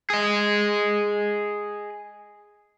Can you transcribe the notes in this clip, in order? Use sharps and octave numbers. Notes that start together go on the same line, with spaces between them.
G#4 D#5